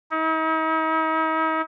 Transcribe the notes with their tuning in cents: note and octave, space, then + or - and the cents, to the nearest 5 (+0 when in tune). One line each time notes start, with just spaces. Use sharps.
D#4 +45